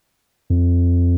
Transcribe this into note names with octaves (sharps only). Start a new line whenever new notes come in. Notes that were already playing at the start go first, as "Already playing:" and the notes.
F2